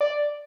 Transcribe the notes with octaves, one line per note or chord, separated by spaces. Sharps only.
D5